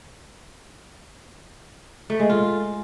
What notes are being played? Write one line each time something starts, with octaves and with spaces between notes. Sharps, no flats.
A3
G#3
F4